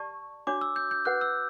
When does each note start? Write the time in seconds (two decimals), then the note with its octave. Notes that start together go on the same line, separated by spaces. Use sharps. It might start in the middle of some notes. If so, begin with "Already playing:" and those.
Already playing: G4 D5 A5 C#6
0.47 D4 F#4 C#5 D6
0.61 E6
0.76 G6
0.91 G6
1.05 F#4 B4 F#5 F#6
1.21 E6